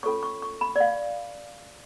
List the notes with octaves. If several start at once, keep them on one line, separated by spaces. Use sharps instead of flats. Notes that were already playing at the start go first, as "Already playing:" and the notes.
C#4 F4 A4 C#5 C#6
C#6
C#6
B5
D5
F5